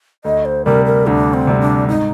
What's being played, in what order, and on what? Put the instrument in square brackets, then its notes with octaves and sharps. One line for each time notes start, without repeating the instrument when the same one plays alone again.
[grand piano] D2 [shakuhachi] D#5
[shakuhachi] C5
[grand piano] C3 G3 [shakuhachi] A#4
[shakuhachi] A#4
[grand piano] D2 [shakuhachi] D4
[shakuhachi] C4
[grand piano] C3 G3
[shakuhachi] D4
[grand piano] G#2 [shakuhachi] D#4